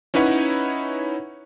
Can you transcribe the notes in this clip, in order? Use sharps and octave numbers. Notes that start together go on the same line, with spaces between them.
C#4 D#4 E4 B4 C#5 F#5